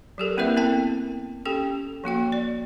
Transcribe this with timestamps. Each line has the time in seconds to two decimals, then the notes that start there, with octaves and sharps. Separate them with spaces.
0.18 F#3 G4 A4 A#4
0.37 A#3 C4 E4 A#4 B4 E5
0.56 B3 C4 E4 A#4 G5 A5
1.45 C#4 G4 A4 G5
2.04 F3 A#3 F#4 G5
2.32 D5